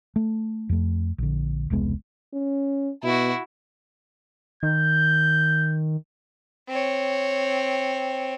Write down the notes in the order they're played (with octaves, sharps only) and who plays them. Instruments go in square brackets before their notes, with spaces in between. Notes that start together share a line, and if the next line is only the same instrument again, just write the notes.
[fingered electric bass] A3
F2 A3
A#1 D3
E1 C2 G#3 B3
[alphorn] C#4
[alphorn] B2 [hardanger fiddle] E4 F#4
[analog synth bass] D#3 [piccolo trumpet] G6
[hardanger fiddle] C4 C#5